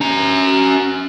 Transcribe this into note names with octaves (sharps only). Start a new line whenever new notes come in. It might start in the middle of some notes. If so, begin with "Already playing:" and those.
C#4 A#5